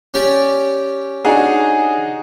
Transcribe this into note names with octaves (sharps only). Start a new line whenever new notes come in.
C#4 G4 D5
D4 D#4 F#4 G#4